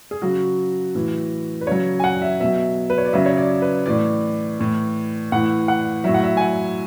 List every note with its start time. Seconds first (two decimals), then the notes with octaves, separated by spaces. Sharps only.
0.11 G#4
0.22 C#3 F#3 F#4
0.95 A2 E3
1.61 B4
1.67 C#3 F#3 C#5
2.00 G#5
2.04 F#5
2.22 E5
2.40 B2 F#3 E5
2.90 B4
2.98 C#5
3.05 D5
3.13 C#3 F#3 E5
3.26 C#5
3.37 D5
3.62 B4
3.86 A2 E3 D5
4.59 A2 E3
5.32 A2 E3 F#5
5.68 F#5
6.04 A2 F#3 E5
6.14 F#5
6.24 E5
6.37 G#5
6.41 F#5